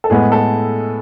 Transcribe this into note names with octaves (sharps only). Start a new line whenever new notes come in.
A4
A2 G#3 B3 G#4
A4